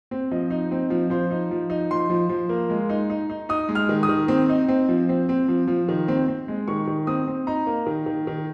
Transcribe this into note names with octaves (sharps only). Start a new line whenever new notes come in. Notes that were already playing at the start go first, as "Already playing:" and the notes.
C4
F3 D#5
D#4
C4
F3
F3 C5
D#4
F3
D#4
F3 C6
F3
F3
A#3
G#3
D#4
D#4
D#4
D#4 D#6
G#3
F6
D#3
D#6
D#3
C4
D#4
C4
F3
C4
C4
F3
F3
D#3
C4
C4
G#3
D#3 C#6
D#3
C4 D#6
C4
D#4 A#5
A#3
D#3
D#3
D#3